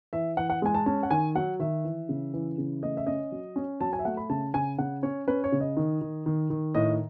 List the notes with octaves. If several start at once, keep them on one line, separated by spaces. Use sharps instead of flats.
E3 E5
E3 F#5
F#5
G#3 G#5
A5
C#4 A5
F#5
D#3 G#5
F#3 F#5
D#3 E5
E3
C#3
E3
C#3
A3 D#5
E5
C#4 D#5
F#3
C#4
F#3 A5
G#5
E5
A3 F#5
B5
C#3 A5
C#3 G#5
C#3 F#5
C#4 C#5
C#4 B4
C#5
C#3
D#5
D#3
D#3
D#3
D#3
A2 D#5